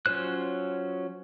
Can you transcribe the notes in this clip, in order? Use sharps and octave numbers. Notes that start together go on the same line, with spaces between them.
F#3 C#4 F4 C5 F#6